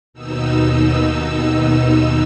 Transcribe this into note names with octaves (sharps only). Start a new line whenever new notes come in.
D#2 B2 D#4 E6